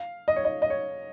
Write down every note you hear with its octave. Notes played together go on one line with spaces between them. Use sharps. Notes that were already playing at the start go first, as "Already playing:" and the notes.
Already playing: F5
D#5
C#5
D#5
D#5
C#5